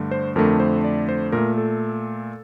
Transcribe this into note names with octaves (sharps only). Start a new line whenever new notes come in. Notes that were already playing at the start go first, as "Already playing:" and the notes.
Already playing: G2 D3 A3
C5
F2 D3 A3 A#4
C5
D5
C5
A#2 A3 A#4
A4